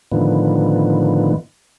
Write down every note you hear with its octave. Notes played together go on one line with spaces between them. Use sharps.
A2 D3 D#3 F3 B3